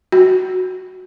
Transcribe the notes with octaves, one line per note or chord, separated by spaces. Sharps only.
F#4